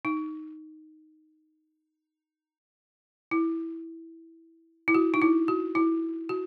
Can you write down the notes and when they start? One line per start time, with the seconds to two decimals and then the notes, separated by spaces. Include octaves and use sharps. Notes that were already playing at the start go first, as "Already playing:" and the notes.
0.05 D#4
3.31 E4
4.88 E4
4.94 F#4
5.14 D#4
5.22 E4
5.48 F#4
5.75 E4
6.29 F#4